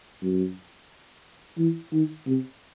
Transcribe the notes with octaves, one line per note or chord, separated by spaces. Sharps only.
F#2
E3
D#3
C3